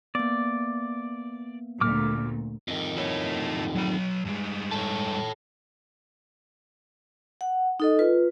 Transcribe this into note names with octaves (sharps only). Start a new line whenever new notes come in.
A#3 B3 D5
D2 A#2 A3 D6 F6
F2 D#3
E4 C#5
F#3 B5
G2 G#3
A4 C#5
F#5
D#4 A4 D#5
F4 B4